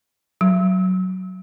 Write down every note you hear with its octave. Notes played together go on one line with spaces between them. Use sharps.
F#3